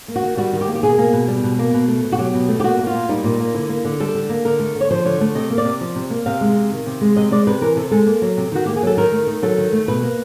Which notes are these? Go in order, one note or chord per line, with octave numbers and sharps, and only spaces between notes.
A#3
F#4
D#3
G3 F#4
D#3
G4
A#3
G4
B2 G#4
A#3
B2
G3
B2
A#3
B2
A3
B2
F#4
F#3 G4
B2
A3
G4
A#2 F#4
A#3
F4
A#2
G3 D#4
A#2
A#3
D3 E4
A#3
D3
G3 A4
D3
A#3
D3 A#4
A3
D3
C#5
F3 C5
D3 C#5
A3
C3 D#5
A#3
D5
C3
F3
C3
A#3
C3 F5
G#3
C3
D#3
C3
G#3
C3 D#5
G#3 D5
C3 B4
E3 A#4
C3 A4
G#3 A4
A#3
F#3
C3
D#3 F#4
A#3 G4
G#4
F#3 A4
D#3 A#4
A3
D#3
F#3 A4
D#3
A3
B2 B4
A#3